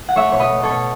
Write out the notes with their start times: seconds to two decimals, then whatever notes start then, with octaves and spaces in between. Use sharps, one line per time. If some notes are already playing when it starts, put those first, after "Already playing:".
0.08 F#5
0.16 A3 C#5 E5
0.32 B2 C#5
0.39 B4 D#5
0.52 A3
0.63 A4 C#5
0.69 B2